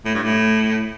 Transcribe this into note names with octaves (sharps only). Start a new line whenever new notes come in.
A2
G2
A2